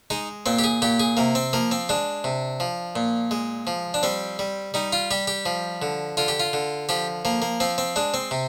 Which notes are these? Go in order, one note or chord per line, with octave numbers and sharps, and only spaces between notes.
G#3 D#4
A#2 C4
G4
G#4
A#2 G4
G#4
C3 A#3
C4
F3 A#3
C4
G#3 D4
C3
F3
A#2
G#3
F3
D4
G3 C4
G3
G3 D#4
F4
G3 G4
G4
F3
D3
D3 F4
G4
F4
D3
F3 G4
F3 A#3
A#3
F3 C4
C4
G#3 D4
C4
C3